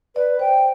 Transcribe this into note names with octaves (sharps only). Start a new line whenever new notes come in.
B4 D5
C5 G5